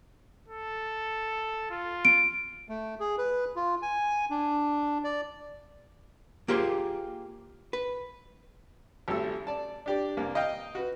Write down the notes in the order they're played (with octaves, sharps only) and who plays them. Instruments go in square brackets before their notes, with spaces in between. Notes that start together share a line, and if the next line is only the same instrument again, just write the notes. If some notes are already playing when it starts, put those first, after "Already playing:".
[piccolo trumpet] A4
F4
[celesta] D7
[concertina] A3
G#4
B4
F4
G#5
D4
D5
[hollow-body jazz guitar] A#3 F4 G4 G#4 C5
B4
[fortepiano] G#1 G3 A3 A4 E6
D5 A5
D4 G4 D5
C2 A#3
D#5 F5 G5
F#4 B4